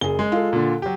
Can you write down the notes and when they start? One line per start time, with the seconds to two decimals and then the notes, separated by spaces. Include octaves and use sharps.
0.01 F#1 G#4 G7
0.19 G#3
0.32 F4 A4
0.53 A#2 D3
0.82 F#3 G4